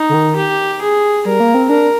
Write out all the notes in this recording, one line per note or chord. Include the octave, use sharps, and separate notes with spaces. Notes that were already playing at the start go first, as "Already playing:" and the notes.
Already playing: D#4
D3
D#3
G4
G#4
G3 A#4
A#3
C4
D4 A#4